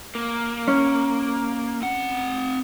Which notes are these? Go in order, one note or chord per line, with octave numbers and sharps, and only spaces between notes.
A#3
C#4
C4 F#5